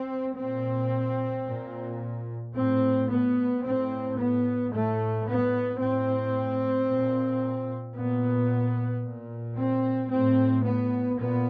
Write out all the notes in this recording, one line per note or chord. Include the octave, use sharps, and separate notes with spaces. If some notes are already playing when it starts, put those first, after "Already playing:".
Already playing: C4
A#2 C4
A#2
A2 C4
B3
A2 C4
B3
A2 A3
B3
A2 C4
A#2
A#2 B3
A#2
C4
A2 C4
B3
A#2 B3